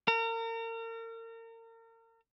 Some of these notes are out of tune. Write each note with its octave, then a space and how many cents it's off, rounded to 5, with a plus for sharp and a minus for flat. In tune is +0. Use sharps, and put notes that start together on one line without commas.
A#4 -35